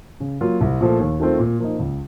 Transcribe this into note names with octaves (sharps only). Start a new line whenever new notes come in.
C#3
F#3 A#3 F4
C2
A#2 F3 A3
D#2
D#3 A3 C4 F4
A#2
F3 A#3 D#4
C#2